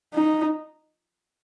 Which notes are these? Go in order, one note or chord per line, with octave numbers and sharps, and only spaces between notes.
D#4